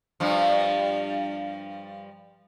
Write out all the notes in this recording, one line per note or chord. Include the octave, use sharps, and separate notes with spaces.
G2 F3